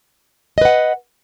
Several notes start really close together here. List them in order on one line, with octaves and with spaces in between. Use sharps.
D#5 B4 F#5